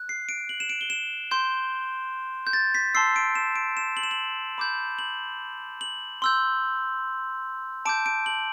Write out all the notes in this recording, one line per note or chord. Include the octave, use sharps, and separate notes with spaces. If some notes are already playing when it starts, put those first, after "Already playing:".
Already playing: F#6
C7
D7
F#7
E7
D7
G7
E7
C6 G6
G6
A6
B6
A5 C6 E6 C7
D7
E7
D7
E7
F#7
E7
F#7
B5 D6 G6
F#7
F#7
C6 E6 G6
A5 D6 G6 D7
D7
F#7